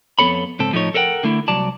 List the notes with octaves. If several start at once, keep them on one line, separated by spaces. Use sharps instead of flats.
F2 C3 B3 A4 C#5 B5
C#2 G#2 C4 A4
A2 F3 G3 A3 D#4 C#5
A4 A#4 C#5 F#5 G5
D3 A3 E4
C2 F#3 D5 A5